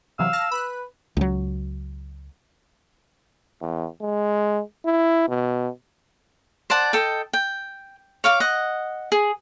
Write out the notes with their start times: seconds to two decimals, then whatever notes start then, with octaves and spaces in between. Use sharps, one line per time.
0.19 C3 E3 F#3 F5 E6
0.33 A5 F6 A#6
0.52 B4 B5 F#6
1.17 C#2 F#3
3.62 E2
4.02 G#3
4.86 E4
5.28 B2
6.70 C5 D5 F#5 A5
6.93 A4 D#5 G5
7.33 G5
8.24 C#5 F5 D6
8.40 D#5 F#5
9.12 G#4